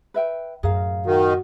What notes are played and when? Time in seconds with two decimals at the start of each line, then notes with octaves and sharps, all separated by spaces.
0.14 B4 E5 G5
0.63 F#2 A2 G#4 A#4 F5
1.06 D#3 F#4